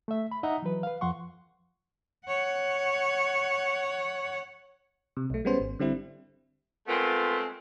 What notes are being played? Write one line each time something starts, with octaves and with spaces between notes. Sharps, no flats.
A3 E5
B5
D#4 D#5 E5 F#5 A#5
E3 F#3 B4
B4 F5
F2 F3 F#5 C6 C#6
C#5 F#5
C3
B1 A3
G3 G#3 B3 C#4 C5
G#1
D3 G3 C4 E4
G#3 A3 B3 C4 F4 A#4